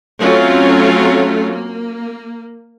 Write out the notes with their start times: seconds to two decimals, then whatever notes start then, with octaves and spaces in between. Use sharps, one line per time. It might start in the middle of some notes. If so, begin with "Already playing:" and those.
0.20 F#3 A3 C4 C#4 F4
1.51 A#3